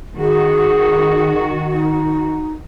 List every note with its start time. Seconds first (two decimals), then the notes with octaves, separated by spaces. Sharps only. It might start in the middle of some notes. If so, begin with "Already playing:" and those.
0.18 D#3 F#4 G#4
1.70 D#4